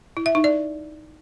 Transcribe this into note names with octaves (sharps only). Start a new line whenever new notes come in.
E4
E5
D#4
D5